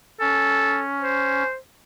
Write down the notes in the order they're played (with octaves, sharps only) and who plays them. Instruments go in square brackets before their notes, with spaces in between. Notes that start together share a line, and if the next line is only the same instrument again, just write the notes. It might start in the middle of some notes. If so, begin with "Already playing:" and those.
[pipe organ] C#4 [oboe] A4
[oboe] C5